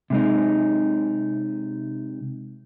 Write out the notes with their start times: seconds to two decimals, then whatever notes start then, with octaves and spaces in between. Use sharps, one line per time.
0.10 C3 G#3 D#4